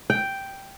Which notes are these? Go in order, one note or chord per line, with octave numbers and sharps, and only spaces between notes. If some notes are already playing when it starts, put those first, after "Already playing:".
G5